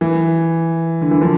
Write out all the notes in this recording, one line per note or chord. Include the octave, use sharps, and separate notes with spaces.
E3
D3
E3
D3 F3